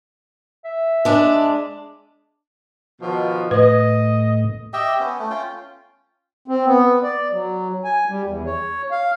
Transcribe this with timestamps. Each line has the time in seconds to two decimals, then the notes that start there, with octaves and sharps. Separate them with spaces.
0.65 E5
1.05 G#3 D4
3.01 B2 D#3 F3
3.51 A2 B4 D#5
4.73 G4 D#5 E5 G5
5.00 B3 C#4
5.19 A3
5.30 C#4 F4 G5
6.48 C4
6.66 B3
7.03 D5
7.32 F#3
7.84 G#5
8.09 G3
8.26 E2
8.46 C#5
8.91 F5